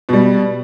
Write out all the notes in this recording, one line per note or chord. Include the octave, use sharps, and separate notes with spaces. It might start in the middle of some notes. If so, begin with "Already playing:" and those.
B2 G3